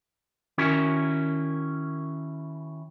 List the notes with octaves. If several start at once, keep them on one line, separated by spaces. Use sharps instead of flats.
D#3 C#4 E4 F#4 A#4